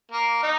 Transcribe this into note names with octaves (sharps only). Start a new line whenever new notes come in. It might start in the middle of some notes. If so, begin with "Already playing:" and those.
A#3
D#4